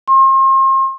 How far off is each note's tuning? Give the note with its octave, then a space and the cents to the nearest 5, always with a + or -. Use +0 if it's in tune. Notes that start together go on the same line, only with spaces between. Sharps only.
C6 +40